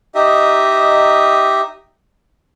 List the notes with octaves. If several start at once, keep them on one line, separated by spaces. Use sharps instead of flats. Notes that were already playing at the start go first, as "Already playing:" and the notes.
D#4 G4 D#5 E5